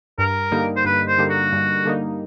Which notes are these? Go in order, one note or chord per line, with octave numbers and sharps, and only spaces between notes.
G2 A#4
D3 G3 A#3 D#4
C5
G2 B4
C5
D3 G3 A#3 D#4
F#4
G2
D3 G3 A#3 D#4